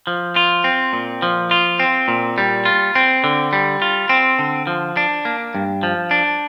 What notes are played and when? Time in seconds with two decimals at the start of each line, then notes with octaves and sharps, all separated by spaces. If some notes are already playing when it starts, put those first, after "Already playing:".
0.07 F3
0.36 F4
0.64 C4
0.93 A#2
1.22 F3
1.51 F4
1.80 C4
2.08 A#2
2.38 G3
2.65 F4
2.95 C4
3.24 D3
3.53 G3
3.82 F4
4.09 C4
4.39 D3
4.67 F3
4.97 D4
5.25 A#3
5.55 G2
5.83 F3
6.11 D4